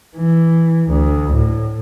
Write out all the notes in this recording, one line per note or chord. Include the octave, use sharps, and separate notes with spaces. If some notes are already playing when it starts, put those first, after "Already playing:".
E3
D2
A2